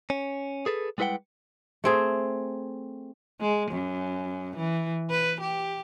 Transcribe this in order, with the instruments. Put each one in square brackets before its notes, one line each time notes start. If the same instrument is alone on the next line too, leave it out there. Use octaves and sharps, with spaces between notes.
[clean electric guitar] C#4
G#4 A4 B4
G3 G#3 E4 B4 F#5 G5
[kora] A3 C4 G#4
[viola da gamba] G#3
F#2
E3
B4
G4